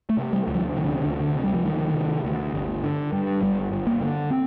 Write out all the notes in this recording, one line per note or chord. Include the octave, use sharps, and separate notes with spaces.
A3
C3
G3
D2
F3
C3 D#3
D3
D3
D2
D3
C3
G3
F3
D2 D#3
C3
D2
G1
D3
G2
G1 G3
G1
A#3
D3
C4